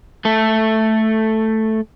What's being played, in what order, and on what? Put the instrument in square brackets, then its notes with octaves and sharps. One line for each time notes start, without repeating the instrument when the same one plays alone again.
[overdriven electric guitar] A3 A4